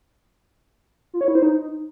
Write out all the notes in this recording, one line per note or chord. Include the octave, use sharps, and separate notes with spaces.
F4
C#5
E4
C5
D#4